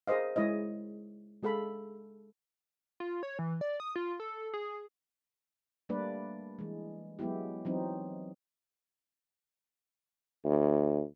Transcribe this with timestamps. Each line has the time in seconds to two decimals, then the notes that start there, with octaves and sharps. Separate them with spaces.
0.07 G#4 A#4 C5 D#5 F5
0.36 G#3 E4 C#5 D#5
1.43 G#3 G#4 A4 F5 B5
3.00 F4
3.23 C#5
3.39 E3
3.61 D5
3.80 D#6
3.96 F4
4.20 A4
4.54 G#4
5.89 G3 A3 A#3 D4 B4 D5
6.59 E3 G#3
7.19 F#3 G#3 B3 E4 G4
7.65 E3 F#3 C4 D#4
10.45 D2